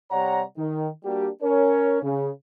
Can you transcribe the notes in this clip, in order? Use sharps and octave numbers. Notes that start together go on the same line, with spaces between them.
C3 G3 C#5 D5 F#5 A#5
D#3
G3 A#3 D4 F#4 G4
C#4 A#4 C#5
C#3